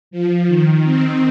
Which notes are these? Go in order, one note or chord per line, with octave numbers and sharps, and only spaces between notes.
F3
D#3
C4